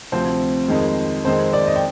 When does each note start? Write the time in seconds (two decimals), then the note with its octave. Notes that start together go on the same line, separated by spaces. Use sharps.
0.12 D2 C3 F3 C4 C5
0.68 F2 D#3 G#3
1.25 F2 D#3 G#3 C4 C5
1.53 D5
1.67 D#5
1.76 G5